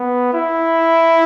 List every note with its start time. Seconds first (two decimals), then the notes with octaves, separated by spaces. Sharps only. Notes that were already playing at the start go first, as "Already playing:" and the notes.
Already playing: B3
0.34 E4